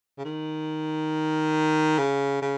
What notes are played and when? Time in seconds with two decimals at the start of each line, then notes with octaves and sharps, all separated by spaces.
0.18 C#3
0.25 D#3
1.98 C#3
2.42 C#3